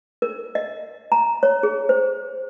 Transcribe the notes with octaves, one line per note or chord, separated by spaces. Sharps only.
A#4
D#5
A#5
C#5
G#4
C5